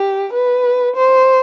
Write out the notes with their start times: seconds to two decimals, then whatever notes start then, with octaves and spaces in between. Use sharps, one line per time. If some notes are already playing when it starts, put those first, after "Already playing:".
Already playing: G4
0.33 B4
0.96 C5